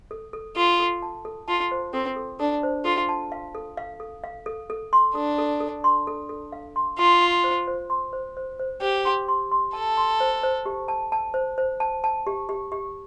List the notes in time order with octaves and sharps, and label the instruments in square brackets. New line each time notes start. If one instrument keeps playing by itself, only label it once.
[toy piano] A4
A4
[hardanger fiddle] F4 [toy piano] A4
[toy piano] A4
A5
A4
[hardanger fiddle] F4 [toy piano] A5
[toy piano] C5
[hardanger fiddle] C4 [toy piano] A4
[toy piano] A4
[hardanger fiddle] D4 [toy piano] A4
[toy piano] C5
[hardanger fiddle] F4 [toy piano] A4
[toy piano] A5
F5
A4
F5
A4
F5
A4
A4
C6
[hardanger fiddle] D4 [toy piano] A4
[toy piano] A4
A4
C6
A4
A4
F5
C6
[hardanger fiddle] F4 [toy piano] C6
[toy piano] C6
C5
C5
C6
C5
C5
C5
[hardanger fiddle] G4 [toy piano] C5
[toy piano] C6
C6
C6
[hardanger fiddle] A4 [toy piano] A5
[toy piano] C6
C5
C5
G4
A5
A5
C5
C5
A5
A5
G4
G4
G4